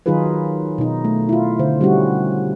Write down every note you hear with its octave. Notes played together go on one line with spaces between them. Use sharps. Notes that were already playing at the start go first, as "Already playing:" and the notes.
D#3 F#3 D#4 F4 G#4 B4
B2 D#4
A3
E4 F4
D3 C5
G3 C#4 E4 F#4